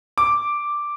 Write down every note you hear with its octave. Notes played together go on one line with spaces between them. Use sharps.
D6